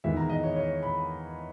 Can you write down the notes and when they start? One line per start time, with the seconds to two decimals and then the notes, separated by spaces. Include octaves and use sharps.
0.04 E2 D#3 G#3 E5
0.17 A#5
0.30 D#5
0.44 C#5
0.56 C#5
0.83 B5